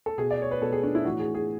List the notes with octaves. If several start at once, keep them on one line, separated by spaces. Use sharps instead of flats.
A4
B2 G#4
D5
C#5
B4
B2 A4
G#4
D4
E4
A2 E3 F#4
G#4
G#4